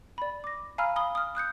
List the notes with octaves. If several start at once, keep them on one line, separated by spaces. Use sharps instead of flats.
D5 B5
D6 A#6
F5 G#5 A#5 B5 E6 F6
B5 D#6 G7
D#6 F6
D#6 F#6 G6 C#7